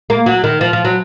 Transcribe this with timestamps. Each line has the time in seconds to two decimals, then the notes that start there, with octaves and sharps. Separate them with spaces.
0.10 A#3
0.26 F#3
0.44 D#3
0.61 F3
0.73 F3
0.85 F#3